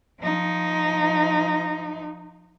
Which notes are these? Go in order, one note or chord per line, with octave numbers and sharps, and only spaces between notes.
F3 D#4